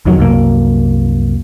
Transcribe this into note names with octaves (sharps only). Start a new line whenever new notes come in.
B1 F2 D#3 F#3
C2 F#2 A#3